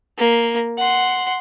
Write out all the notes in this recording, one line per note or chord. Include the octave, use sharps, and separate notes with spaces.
A#3
F#5 C6